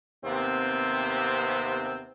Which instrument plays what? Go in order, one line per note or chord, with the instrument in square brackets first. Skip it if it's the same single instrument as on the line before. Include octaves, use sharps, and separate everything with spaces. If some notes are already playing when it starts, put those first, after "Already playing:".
[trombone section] D#2 C3 B3 C4